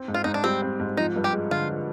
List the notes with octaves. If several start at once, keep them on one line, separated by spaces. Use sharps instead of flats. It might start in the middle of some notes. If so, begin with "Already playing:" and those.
Already playing: C4
G#2
F4
G#2 D#4
D4
G3 C4
C4
G#2
F3 D#4
G2
G4
G#3
D3 F4
F3